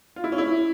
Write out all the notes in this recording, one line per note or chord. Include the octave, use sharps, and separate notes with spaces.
F4
E4
C#4
E4